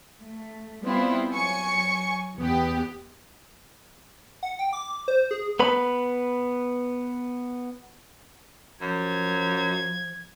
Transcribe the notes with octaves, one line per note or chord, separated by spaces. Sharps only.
A3
G3 B3 C4 E4 F4
F#3 G#5 C#6 C#7
E2 B3 G4
F#5
G5
D6
C5
G#4
B3 B4 B5
F#2 F3 G#6